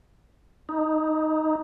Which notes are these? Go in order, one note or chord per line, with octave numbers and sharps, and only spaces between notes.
D#4